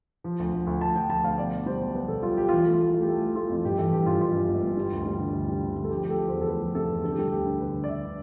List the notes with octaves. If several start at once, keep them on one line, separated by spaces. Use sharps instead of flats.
F3
D2
D2
D2
D2 A5
F3 G5
D2 A5
D2 F5
B2 D5
B2
G3 C5
B1
B3 B4
B1 A4
G3 F4
B3 G4
E3 F4
A3 E4
F4
A3
A3
G4
A3 A4
A3
A3 F4
F2
G2 G4
E3 A4
G2 G4
G2 F4
G2 F4
G2
G1
G1
G3
D2
G3
D3
D2
G3
D3
G3
A4
F3 G4
A3 G4
A4
A3
E2 C5
A4
A3 B4
F3
C3 A4
E2
D3 A4
G4
G3 A4
D2 G4
D3
G3 B4
D3
D5
D3 E5